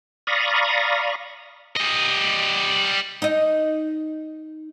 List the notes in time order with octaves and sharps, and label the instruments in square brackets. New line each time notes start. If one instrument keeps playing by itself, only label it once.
[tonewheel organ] D5 F5 A#5 B5 C#6 D#6
[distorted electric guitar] G3 D#5
[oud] D#4 D#5